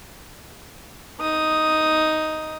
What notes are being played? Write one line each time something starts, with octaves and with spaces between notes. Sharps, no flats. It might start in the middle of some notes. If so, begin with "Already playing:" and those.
D#4 D#6